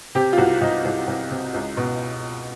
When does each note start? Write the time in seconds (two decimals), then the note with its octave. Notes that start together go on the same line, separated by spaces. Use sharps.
0.15 C3 G4
0.33 F4
0.38 C2 F#4
0.61 C2 D#4
0.85 C2
1.08 C2
1.31 C3
1.54 C#2
1.77 B2